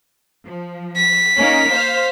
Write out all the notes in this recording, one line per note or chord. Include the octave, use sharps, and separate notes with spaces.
F3
B6
A#3 C#4 D#4
C5 F5